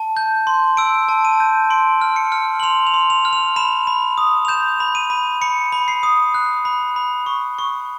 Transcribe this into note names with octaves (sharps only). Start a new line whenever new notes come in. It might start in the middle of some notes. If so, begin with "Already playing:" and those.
Already playing: A5
G6
C6
E6 D7
A5
D#7
G6
C6 D7
F6
C#7
F6
F#7
C6 F7
F7
C6
F7
F6
F7
B5 E7
B5
D#6
F7
G6 E7
B5
D#7
B5
B5 C#7
B5
C7
D#6
F#6
B5
B5
C#6
C#6